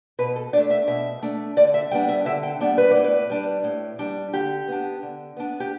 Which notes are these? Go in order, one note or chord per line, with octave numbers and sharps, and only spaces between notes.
B2 B4
A4
A3 D4 D5
E5
B2 E5
A3 D4
D3 D5
E5
G3 B3 D4 G5
E5
D3 E5
G5
G3 B3 D4
B4
A2 D5
B4
G3 D4
A2
G3 D4
D3 G4
B3 D4
D3
B3 D4
G4